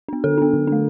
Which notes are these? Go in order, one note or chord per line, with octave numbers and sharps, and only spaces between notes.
B3 D4
D3 A4
B3 D4
D3
A3 D4